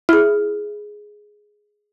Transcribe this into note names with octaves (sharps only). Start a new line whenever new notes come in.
E4 G#4 F6